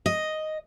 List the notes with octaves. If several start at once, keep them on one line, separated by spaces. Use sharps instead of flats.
D#5